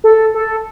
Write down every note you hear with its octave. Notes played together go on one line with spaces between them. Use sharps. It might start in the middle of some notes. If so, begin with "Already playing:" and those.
A4
A4